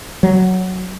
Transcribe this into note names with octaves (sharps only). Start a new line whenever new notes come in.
F#3